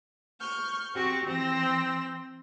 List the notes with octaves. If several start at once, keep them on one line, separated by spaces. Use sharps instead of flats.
C#6 F6 G6
C4 F#4 G4 C#6
E3 C4 E6 A#6